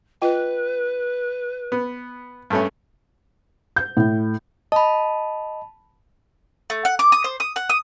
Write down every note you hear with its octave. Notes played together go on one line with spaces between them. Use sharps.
F4 B4 D#5 G5
B3
G2 A3 C#4 E5
G6
A2
D#5 A5 B5
A3
F#5
D6
D#6
C5
D#6
F#5
D#6